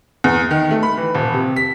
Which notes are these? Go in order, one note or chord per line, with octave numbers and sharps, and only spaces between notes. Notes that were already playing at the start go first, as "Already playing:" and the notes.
E2
D#3
A3
B5
E3
D#1
C3
B6